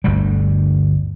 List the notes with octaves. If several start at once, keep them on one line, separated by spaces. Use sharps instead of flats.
G1 D2 G3